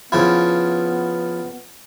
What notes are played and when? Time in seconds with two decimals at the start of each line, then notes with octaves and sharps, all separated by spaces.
0.12 C#3 F3 B3 E4